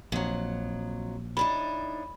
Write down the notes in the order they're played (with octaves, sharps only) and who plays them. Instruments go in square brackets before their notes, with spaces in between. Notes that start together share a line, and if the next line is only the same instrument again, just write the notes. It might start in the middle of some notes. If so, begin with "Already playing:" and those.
[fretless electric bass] A#1 [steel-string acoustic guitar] F2 F#3
[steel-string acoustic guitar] A2 D4 D#4 [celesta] B5